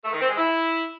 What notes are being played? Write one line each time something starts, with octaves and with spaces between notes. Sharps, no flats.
A3
D#3
C4
G#3
E4